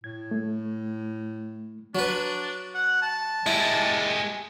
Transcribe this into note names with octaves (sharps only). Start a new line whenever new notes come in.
A2 G#6
A3
F#3 D4 B4
F#5
A5
G#3 E4 G4